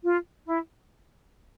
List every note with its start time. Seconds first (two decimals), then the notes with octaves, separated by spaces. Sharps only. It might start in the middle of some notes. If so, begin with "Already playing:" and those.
0.03 F4
0.45 E4